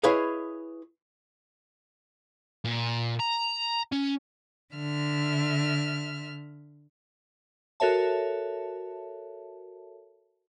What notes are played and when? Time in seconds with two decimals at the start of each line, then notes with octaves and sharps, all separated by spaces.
0.03 E4 G#4 B4 C#5 D#5 F5
2.65 A#2
3.19 A#5
3.92 C#4
4.75 D3 E5 F6
7.80 F#4 A4 A#4 C#5 E5 A5